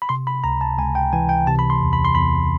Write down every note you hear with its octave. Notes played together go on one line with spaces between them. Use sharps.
B5
C3 C6
B5
C#2 A#5
A5
C#2 G#5
G5
E3 G#5
G5
C3 A5
B5
C6
E2
B5
C6
E2 B5